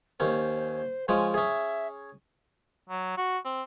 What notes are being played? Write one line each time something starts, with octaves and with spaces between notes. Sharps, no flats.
D#2 C#4 C5
F3 G#3 C#4 G#5
C#4 G#4 E5
F#3
F#4
C4